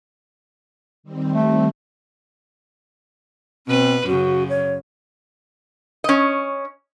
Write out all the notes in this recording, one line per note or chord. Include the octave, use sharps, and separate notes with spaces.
D#3 G3 C4
A3
B2 C4 B4
F#2 C#3 F#4
C#5
C#4 D#5